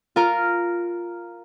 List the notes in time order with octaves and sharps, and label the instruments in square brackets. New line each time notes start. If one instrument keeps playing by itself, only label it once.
[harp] F4 A#4 F6